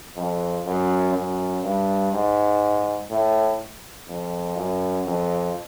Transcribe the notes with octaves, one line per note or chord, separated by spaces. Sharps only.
F2
F#2
F#2
G2
G#2
A2
F2
F#2
F2